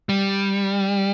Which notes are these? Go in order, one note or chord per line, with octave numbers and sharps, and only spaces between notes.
G3